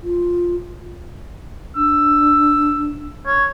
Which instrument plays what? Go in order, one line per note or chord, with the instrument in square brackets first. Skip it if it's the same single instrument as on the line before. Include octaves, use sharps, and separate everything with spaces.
[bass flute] F4
[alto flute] D4 [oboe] E6
[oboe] C#5